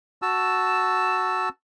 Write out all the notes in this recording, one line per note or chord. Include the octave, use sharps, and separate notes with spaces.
F#4 A5 E6